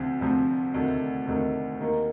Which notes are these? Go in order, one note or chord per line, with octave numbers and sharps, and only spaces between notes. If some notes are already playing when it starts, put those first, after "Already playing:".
Already playing: D2 C3 F3 C4
D2 C3 F3 C4
D2 C3 D#3 A3
D2 C3 D#3 A3
D#2 D#3 A#3